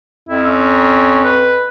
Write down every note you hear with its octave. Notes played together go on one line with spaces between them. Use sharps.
F2 E4
C#4
B4